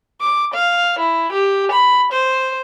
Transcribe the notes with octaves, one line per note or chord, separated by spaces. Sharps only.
D6
F5
E4
G4
B5
C5